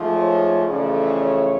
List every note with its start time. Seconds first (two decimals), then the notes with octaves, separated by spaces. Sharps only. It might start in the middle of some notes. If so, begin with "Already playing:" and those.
Already playing: G#2 F3 A3
0.16 C#5
0.67 F2 C#3 E3 A3 D5
1.18 C#5